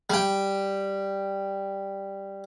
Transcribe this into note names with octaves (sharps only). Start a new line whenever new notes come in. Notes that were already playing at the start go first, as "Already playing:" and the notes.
G3 G5